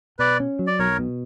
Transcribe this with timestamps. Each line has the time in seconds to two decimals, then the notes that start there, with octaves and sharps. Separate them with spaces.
0.19 B2 B4 D5
0.40 C#4
0.59 F#3
0.67 D5
0.79 B1 A#4 C#5
0.99 B2